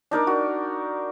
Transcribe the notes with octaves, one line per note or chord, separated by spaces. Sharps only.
D4 D#4 A#4 D5
F#4